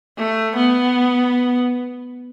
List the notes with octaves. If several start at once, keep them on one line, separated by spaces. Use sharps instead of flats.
A3
B3